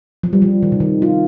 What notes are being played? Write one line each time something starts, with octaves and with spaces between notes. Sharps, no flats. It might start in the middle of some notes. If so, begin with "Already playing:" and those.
F3
G3
F3
D#3
C3
D#3
F4